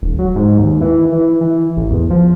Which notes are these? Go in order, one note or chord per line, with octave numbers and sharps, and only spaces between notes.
D#1
F#3
G#2
D#2
E3
E3
E3
A1
E2
F3